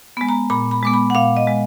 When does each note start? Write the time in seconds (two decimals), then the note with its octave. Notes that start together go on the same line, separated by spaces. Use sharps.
0.17 G#3 B3
0.29 A#5
0.50 A#2 B5
0.71 B5
0.83 G#3 B3 D6
0.93 B5
1.10 F#5
1.15 A#2 F5
1.36 D#5
1.47 G#3